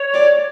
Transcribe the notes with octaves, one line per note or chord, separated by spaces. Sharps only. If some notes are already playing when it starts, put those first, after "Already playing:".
Already playing: C#5
D5